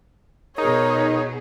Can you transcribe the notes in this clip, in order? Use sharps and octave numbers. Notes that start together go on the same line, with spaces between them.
B2 D#4 G#4 A#4 C#5